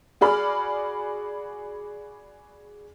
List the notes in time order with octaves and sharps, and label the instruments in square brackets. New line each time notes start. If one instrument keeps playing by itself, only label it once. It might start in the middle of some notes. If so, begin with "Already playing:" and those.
[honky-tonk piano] F#4 G#4 D5 B5 F6